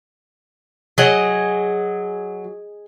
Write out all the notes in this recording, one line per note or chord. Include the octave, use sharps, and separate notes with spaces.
F#3 G#4 D#5